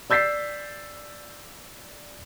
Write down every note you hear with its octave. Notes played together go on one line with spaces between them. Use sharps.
D5 E6 G6 A6 B6 C7